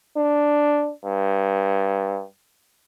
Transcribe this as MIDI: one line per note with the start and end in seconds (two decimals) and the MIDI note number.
0.17 0.92 62
1.04 2.24 43